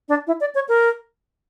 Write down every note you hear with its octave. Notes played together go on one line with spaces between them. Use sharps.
D4
E4
D5
C#5
A#4